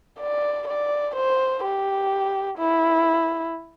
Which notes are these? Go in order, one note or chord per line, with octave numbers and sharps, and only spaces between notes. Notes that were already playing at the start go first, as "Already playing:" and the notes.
D5
D5
C5
G4
E4